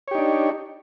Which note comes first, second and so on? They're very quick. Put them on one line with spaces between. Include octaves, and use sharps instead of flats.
C#5 G4 D#4 D4